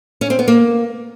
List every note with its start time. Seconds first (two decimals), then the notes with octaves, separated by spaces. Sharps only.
0.21 C#4
0.30 C4
0.39 B3
0.48 A#3